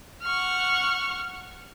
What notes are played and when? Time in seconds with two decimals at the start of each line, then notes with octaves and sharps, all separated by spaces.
0.24 F#5 C#6 F6